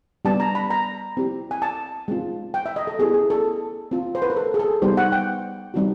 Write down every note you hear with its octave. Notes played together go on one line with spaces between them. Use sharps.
G3 B3 D4 G4 A5
A#5
B5
A#5
C4 E4 G4
G#5
A5
G#3 C4 F4
G5
E5
D#5
A4
B3 E4 G4 G#4
G#4
A4
C4 F4
C5
B4
A#4
A4
G#4
A4
G3 B3 D#4 G4 C5
F#5
G5
G3 C4 D#4 F#4